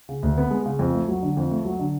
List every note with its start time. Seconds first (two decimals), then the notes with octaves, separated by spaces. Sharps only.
0.09 C#3
0.23 D2
0.38 B3
0.51 G#3
0.66 C#3
0.79 F2
0.94 A3
1.08 F#3
1.23 D3
1.37 F2
1.51 A3
1.65 F#3
1.79 D3